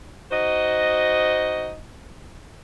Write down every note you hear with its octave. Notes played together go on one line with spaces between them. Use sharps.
D#4 F#4 C5 D#5